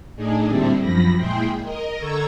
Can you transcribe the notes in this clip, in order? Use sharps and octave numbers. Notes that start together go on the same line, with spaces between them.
A2 D4 D#4 G#4
A#2 D3 G3 C4 D4 E4
F#2 F3 B5 A#6
A#2 G#3 E4 G#4 G5 C6
A#4 D#5
D3 A4 A#5 C#6 E6 G#6